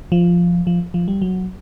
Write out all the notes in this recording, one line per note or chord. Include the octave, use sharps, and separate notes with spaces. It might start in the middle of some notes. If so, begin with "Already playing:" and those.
F3
F3
F3
G3
F#3